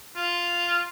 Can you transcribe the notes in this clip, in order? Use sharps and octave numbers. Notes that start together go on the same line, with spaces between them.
F4